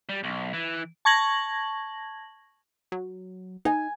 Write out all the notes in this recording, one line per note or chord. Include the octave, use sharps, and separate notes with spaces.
G3
B1
E3
A5 C#6 G#6 A#6 F#7
F#3
D#4 G#5